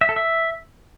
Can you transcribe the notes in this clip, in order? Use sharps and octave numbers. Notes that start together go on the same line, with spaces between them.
E5
A4
E5